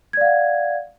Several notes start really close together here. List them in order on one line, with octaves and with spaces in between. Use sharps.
G#6 D5 F5 F#5